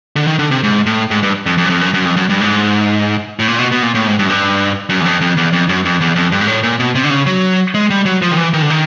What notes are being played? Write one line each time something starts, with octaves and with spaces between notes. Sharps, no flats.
D3
D#3
D3
C3
G#2
A2
G#2
G2
F2
F2
F#2
F2
F#2
F#2
F2
F#2
G2
G#2
A2
A#2
B2
B2
A#2
A2
G#2
G2
F#2
G2
F#2
E2
F2
F2
E2
F2
F#2
F2
E2
F2
G2
G#2
A2
A#2
B2
C3
D3
C#3
F#3
G#3
G3
F#3
F3
D#3
E3
D#3
D3
D#3